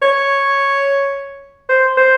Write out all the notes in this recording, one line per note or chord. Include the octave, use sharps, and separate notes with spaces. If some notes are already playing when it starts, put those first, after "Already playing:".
C#5
C5
C5